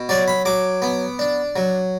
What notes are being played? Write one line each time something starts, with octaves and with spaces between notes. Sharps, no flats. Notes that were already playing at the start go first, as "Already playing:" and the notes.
Already playing: B2
F#3 D5
B5
F#3 D6
B3
D4
F#3